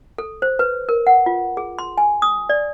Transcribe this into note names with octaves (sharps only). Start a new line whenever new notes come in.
A4
C5
B4
A#4
F#5
F4
G#4
C6
G#5
D#6
D5